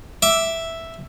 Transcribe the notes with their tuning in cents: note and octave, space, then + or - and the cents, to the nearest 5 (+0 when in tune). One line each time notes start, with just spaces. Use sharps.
E5 +0 D6 +0